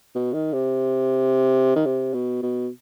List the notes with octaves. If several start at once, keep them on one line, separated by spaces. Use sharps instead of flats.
B2
D#3
C3
D#3
C3
B2
B2